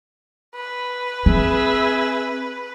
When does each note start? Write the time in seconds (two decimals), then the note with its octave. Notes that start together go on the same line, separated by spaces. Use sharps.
0.55 B4
1.26 C4 G#4 E5